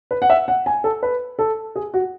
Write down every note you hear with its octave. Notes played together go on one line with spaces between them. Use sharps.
B4
F#5
E5
F#5
G#5
A4
B4
A4
G#4
F#4